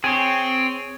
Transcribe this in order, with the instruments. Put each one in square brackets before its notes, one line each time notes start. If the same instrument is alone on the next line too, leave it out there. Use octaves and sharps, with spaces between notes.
[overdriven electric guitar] C4 [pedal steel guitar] G#4 C#5